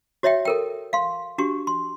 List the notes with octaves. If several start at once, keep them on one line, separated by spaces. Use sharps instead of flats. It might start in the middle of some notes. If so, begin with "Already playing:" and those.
F#4 C#5 D#5 E5 G5
A4 A#4 G5
F5 C6
D4 F#4 G4 C#6
C6